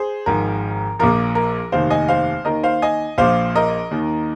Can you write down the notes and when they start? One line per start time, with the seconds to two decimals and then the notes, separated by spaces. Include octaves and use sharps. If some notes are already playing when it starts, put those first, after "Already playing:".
Already playing: G#4 C5
0.26 G#1 G#2 F3 A#4
0.99 A#1 A#2 F3 A#4
1.35 A#4
1.72 F1 D#2 D#3 C5 F5
1.90 D#5 G#5
2.08 C5 F5
2.45 D#2 D#3 A#4 D#5
2.63 C5 F5
2.82 D#5 G#5
3.18 A#1 A#2 F3 C5 F5
3.56 A#4 D#5
3.91 D#2 D#3